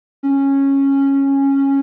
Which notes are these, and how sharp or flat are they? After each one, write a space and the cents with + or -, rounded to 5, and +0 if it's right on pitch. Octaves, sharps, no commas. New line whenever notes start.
C#4 -10